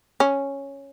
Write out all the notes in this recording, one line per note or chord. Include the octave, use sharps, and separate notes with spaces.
C#4